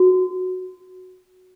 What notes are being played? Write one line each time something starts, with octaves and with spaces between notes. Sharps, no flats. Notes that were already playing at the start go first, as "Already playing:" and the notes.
Already playing: F#4